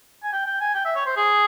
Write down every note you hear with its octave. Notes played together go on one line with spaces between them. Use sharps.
G#5
G5
G5
G#5
G5
E5
C#5
C5
G#4